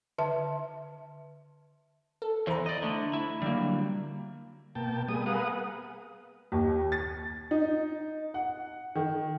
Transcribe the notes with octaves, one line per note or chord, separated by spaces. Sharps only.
D3 E5 A5
A4
E2 E3 C5 A#5
D5 D#5
D3 A3
E4
D3 F#3 G3 A#3
B2 A#3 G5 A5
G3 A#3 B3 G#4 D#6
G#4 A#4 B4 F5 F#5 D#6
D#2
A6
D#4
F#5
D#3